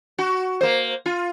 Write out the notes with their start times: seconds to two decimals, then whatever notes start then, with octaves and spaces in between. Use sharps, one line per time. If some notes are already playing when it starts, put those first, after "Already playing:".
0.18 F#4
0.61 A#3 C5
1.06 F4